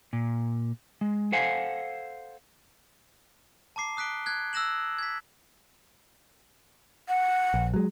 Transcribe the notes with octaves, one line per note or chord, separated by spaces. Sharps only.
A#2
G#3
A4 C5 F5 F#5 G#5
A5 A#5 D6 C7
D#6 F#6 B6 D7 G7
F#6 G#6
E6 F#6 A#6 E7 F#7
G#6 B6
F#5
A#1
F#3 G#3